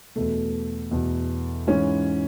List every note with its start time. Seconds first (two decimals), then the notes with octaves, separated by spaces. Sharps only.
0.16 E2 B2 A3
0.91 E2 B2
1.67 G#2 E3 C#4